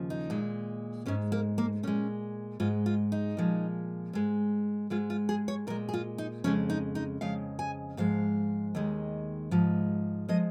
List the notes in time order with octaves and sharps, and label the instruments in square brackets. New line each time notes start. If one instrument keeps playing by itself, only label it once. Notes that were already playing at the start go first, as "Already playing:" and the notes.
Already playing: [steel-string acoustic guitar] D#2 C#3 F3
D#4
A#2 G#3
G#2 G#3 C#4
A#3
A#3
A#2 G#3 C#4
G#2 G#3 F4
F4
D#4
A#2 F3 G#3
G#2 G#3
G#2 G#3 F4
F4
G#4
C#5
A#2 A#4
G#3
G#4
F4
D#4
F2 C#3 G#3 C#4
D#4
D#4
F2 C#3 G#3 F5
G#5
G#2 F3 G#3 F5
D#2 D#3 G#3
G#2 F3 G#3
F3 G#3 D#5